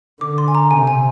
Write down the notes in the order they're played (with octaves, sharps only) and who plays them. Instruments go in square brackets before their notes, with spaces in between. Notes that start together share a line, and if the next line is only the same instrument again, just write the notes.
[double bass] D3 [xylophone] D6
[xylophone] C6
G#5
A#5
[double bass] C3 [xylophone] G#5
[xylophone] G#5